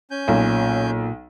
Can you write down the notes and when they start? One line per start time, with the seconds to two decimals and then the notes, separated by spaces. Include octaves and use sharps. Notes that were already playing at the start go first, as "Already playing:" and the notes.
0.11 C#4 G#5 G6
0.28 B1 A#2